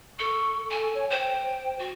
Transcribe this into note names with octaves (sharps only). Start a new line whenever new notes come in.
A4 C#6
A4 G#5
C#5
C5 G5
F#4